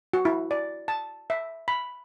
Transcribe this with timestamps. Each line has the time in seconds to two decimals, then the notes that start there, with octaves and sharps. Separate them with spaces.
0.13 F#4
0.25 E4
0.51 D5
0.88 A5
1.30 E5
1.68 B5